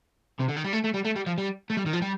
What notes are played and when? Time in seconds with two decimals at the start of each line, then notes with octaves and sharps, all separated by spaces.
0.40 C3
0.49 D3
0.56 D#3
0.64 G3
0.73 A3
0.84 A3
0.94 G3
1.05 A3
1.16 G3
1.26 F3
1.38 G3
1.70 A3
1.77 G3
1.86 D#3
1.93 F3
2.02 G3